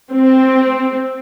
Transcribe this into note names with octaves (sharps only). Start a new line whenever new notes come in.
C4